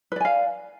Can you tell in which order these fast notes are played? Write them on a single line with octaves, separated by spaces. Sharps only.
B4 D5 G#5 F5